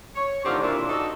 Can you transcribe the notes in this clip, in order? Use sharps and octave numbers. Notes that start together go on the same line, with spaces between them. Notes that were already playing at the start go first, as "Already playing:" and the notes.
C#5
A2 D3 D#3 C4 F4 G4
A#2 D4 E4
D4 D#4 F#4 A4